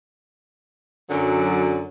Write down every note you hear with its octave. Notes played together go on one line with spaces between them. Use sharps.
F#2 D3 F#3